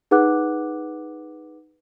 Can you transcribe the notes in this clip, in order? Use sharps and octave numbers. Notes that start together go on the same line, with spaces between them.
D#4 G#4 B4 F#5 D6 F#6